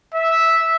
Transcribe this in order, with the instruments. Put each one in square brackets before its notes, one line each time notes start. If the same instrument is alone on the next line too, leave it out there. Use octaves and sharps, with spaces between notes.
[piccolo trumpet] E5